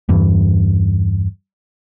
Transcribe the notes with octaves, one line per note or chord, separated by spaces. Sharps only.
E2 G2 E3